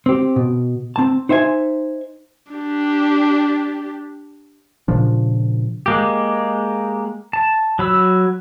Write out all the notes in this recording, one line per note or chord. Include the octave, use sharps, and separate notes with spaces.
C4 G4
B2
C4 A5
D#4 C5 E5 F5 G#5
D4 G4
A#2 C#3 F3 D4
G#3 A#3 G4
A5
F#3 B5 E6